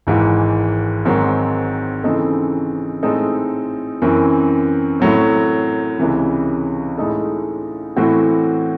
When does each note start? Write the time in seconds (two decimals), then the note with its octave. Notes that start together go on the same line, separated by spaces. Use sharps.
0.07 G#1 G#2 E3
1.05 G#2 D#3 F#3 C4
2.04 C#3 E3 C4 D#4 A4
3.03 A2 G#3 C4 D#4 A4
4.02 F#2 E3 C4
5.00 A2 F#3 C4
5.99 C#2 C3 E3
6.98 A2 G#3 D#4 A4
7.96 A2 E3 C4 F#4